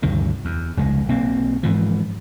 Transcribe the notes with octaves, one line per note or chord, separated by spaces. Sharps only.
D2 G2 C3 D#3
E2
F1 C#2 G#3
B1 A#3 C4
G#2 E3 F3